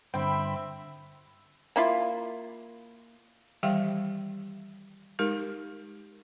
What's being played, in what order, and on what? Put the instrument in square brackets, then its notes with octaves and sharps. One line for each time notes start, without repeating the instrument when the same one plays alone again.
[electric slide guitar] G2 D3 [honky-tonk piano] C4 G5 [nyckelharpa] E5 [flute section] B5 C6
[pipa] A#3 E4 F4
[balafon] D#3 E3 G3 G4 F5 G5
G#3 D#4 G4 A#4